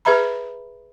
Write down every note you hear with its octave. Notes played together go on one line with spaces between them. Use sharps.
G#4 B4 E5 A#5 B5